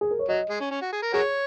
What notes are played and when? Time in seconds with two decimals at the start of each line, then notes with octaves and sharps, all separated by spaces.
0.01 G#4
0.11 A#4
0.19 C#5
0.29 F#3 D#5
0.50 G#3
0.60 C#4
0.71 C#4
0.82 F#4
0.92 G#4
1.02 A#4
1.13 F#4 G#4 A#4 C#5